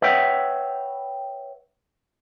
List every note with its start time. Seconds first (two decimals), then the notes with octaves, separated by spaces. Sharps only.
0.02 B4 C#5 E5 F#5 G5